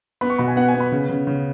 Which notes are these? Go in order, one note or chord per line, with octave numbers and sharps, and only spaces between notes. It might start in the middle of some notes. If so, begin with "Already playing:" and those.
B3 B5
C#6
B2 B5
G#5
B3 F#5
G#5
B3
B5
C#3
C#3
C#3